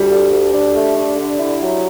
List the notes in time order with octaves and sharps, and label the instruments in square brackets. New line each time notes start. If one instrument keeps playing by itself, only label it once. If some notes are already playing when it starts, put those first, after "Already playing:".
Already playing: [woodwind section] D2 [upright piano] G3
[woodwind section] D3
D2
D4
A3
D4
D3
E4
F#3